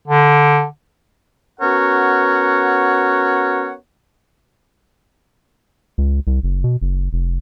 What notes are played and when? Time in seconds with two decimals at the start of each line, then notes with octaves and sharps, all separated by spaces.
0.08 D3
1.60 B3 C#4 F#4 A#4 C#5 F#5
5.98 C#2
6.27 C2
6.43 F#1
6.64 B2
6.81 F#1
7.13 F1